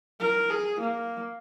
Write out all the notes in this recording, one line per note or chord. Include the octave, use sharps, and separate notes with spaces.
A#4
G#4
A#3